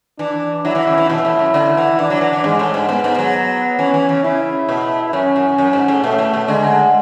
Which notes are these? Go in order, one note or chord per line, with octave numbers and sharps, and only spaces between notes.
E3 D4
F#3 E4
E3
C#3
E3
B2 E4
A2
F#2
D3
E3
E3 D4
F#3
E3
E3
G#2 G#3
A2
G#2
G#2 B3
G#2
F#3
E3 C#4
E3
C#3
C#3 E4
B2
F#2 C#4
F#2
F#2
G#2
A2
B2 A3
A2
B2
D3 G#3